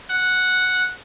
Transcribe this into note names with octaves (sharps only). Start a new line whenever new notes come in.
F#5